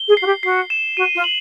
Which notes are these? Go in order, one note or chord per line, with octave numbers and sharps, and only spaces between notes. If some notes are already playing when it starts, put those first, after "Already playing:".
Already playing: G7
G#4
F#4 C7
G4
F#4 C7
E7
F#4 D#7
F4
F#7